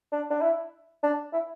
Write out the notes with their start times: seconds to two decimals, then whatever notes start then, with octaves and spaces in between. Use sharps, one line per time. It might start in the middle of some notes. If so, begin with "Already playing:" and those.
0.12 D4
0.30 D4
0.42 E4
1.03 D4
1.33 E4